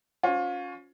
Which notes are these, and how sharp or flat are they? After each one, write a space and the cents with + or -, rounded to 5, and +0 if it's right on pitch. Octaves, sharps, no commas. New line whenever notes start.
C#4 +15 F4 +35 C5 +0